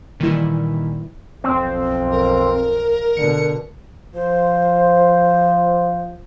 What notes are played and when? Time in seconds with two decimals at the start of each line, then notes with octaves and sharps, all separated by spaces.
0.20 A#2 D#3 E3 G3 E4
1.44 B1 F2 C4
2.11 A#4
3.17 B2 D3 C#7
4.14 F3 C5